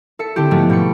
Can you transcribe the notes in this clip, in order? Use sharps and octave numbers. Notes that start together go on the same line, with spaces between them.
A4 E5 C#7
D3 C4 E4 G4
G#2 F3 A3 B3
B2 G4 B5 C#7